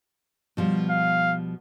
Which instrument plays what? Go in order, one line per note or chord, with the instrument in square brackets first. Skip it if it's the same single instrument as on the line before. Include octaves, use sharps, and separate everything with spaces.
[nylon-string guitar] B2 F3 G3
[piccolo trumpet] F5